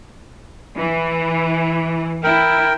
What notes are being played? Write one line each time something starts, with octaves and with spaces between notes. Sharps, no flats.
E3
E4 A#4 G5